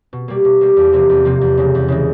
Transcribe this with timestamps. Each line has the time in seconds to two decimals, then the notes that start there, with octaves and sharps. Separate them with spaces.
0.13 B2
0.28 G3 A#3
0.45 B2
0.61 G3 A#3
0.77 E2
0.93 C3 F3 A#3
1.09 E2
1.25 C3 F3 A#3
1.41 E2
1.57 C#3 E3 G#3
1.75 E2
1.88 C#3 E3 G#3